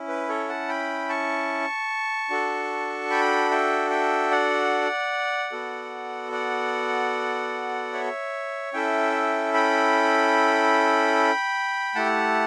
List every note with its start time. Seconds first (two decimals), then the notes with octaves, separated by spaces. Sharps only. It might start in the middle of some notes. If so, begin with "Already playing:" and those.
Already playing: C#4 E4
0.08 B4
0.29 A4 C#5
0.49 F#5 A5
0.69 G5 B5
1.09 A5 C#6
2.30 D4 F#4 A4
3.10 G5 B5
3.51 E5 G5
3.90 E5 G5
4.31 D5 F#5
5.52 B3 F#4 A4
6.32 D5 F#5
7.93 C#5 E5
8.73 C#4 E4 A4 E5 G5
9.54 G5 B5
11.95 A3 E4 G4 F#5 A5